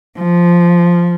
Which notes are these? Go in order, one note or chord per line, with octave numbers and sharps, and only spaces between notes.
F3